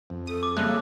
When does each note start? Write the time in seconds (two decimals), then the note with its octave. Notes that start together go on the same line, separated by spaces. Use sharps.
0.10 F2
0.27 A4 D#6
0.43 D6
0.57 C#3 G3 G#3 A#3 A4 E5 F#6